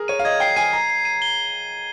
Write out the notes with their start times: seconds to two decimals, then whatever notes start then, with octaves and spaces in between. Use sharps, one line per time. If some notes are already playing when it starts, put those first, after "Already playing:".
Already playing: G#4 A#4
0.08 C#5 D#7
0.19 F5
0.25 D#5 G#6
0.40 G5 C7
0.56 G#5 D#7
0.73 A#5 C7
0.89 C7
1.05 D#7
1.22 G7